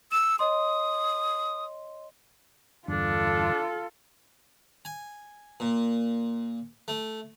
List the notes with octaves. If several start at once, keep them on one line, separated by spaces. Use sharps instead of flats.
E6 E7
C#5 D#5 C6 D#6
E2 G2 D3 D4 F4 A4
G#5
A#2
A3